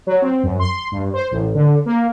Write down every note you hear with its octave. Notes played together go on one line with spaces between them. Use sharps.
F#3
C4
F#2
C6
G2
C5
A1
D3
A#3